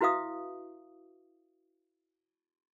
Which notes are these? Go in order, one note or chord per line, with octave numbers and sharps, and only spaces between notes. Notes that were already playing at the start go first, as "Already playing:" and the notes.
E4 F#4 B4 E5 F5 D#6